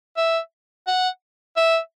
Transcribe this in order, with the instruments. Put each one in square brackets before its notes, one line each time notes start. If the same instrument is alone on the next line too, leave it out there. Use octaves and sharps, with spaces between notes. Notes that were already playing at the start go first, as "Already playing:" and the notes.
[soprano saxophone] E5
F#5
E5